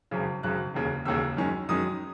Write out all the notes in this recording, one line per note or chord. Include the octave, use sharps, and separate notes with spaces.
G#1 F#2 C#3
G#1 F#2 C#3 F#6
E1 D#2 C#3
E1 D#2 C#3 E6
F#2 D#3 G#3 C#4
F#2 D#3 G#3 C#4 D#6